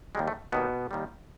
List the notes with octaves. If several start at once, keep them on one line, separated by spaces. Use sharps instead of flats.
D#2 D#3 G3 G#3
A3
D#2 B2 D#3 G3 B3
D#2 D#3 G3